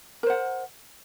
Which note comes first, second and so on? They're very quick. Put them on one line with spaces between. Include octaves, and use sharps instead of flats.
A#4 C5 F#5